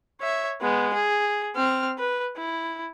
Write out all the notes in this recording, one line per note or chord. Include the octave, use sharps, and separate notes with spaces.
C#5 E5
G#3 B3
G#4
C4 F6
B4
E4